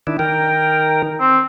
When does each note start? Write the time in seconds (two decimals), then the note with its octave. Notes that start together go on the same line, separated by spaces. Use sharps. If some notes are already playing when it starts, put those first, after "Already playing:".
0.07 D#3 D4 E4
0.19 D#3 A#4 G5
1.21 C4